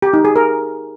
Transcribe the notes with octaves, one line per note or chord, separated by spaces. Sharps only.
G4
D#4
G#4
A#4